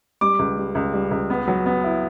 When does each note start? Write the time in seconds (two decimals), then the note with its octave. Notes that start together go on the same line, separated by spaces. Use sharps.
0.21 G3 D6
0.39 C#2
0.57 G3
0.75 C#2
0.93 G3
1.11 C#2
1.30 B3
1.48 F#3
1.66 B3
1.84 E4